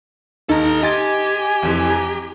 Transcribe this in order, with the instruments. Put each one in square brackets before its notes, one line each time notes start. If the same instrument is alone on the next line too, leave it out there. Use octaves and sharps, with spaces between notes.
[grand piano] D#2 [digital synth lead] D#4 [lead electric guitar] A4 A#5
[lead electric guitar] G4 [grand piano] D#5 C6 A6 [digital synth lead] G#5
[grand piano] F1 F2 E3
A#5